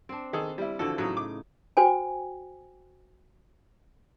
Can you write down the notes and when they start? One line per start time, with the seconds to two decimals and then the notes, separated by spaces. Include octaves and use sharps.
0.09 C4 D4
0.33 D#3 G#4 A4
0.58 G3 E4
0.79 D3 E3 F3 F#4 A4
0.98 A2 C#3 F#3 D#4
1.17 D6
1.77 F#4 C5 G5 G#5